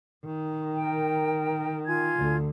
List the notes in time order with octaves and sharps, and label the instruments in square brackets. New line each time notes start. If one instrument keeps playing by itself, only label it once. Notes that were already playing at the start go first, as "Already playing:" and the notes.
[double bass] D#3
[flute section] A#4 G5
F4 G#5 G#6
[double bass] D2 D3